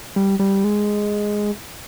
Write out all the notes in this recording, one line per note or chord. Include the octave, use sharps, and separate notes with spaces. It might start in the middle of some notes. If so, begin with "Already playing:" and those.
G3
G3
G#3